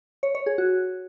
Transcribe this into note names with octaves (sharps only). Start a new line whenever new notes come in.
C#5
C#5
G#4
F#4